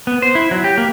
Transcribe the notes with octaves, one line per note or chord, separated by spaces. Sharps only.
B3
C5
E4
F#3
G4
A#3